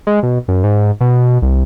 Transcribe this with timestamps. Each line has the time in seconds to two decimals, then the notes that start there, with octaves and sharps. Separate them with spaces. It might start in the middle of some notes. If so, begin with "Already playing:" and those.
0.07 G#3
0.23 B2
0.48 F#2
0.64 G#2
1.01 B2
1.42 C2